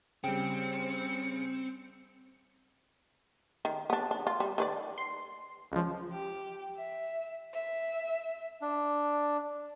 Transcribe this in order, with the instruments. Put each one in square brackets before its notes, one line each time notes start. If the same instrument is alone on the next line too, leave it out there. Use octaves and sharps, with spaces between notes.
[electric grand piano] C#3 G3 [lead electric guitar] C4 [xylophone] G5 [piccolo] C#7
[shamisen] D#3
B3 D4
D4
F4
G3
D#3 B4 D5
[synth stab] C6
C#2 F3
[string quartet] G4
E5
E5
[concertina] D4